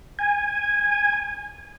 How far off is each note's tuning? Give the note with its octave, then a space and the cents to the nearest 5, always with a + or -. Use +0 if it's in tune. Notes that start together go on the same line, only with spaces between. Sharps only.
G#5 -15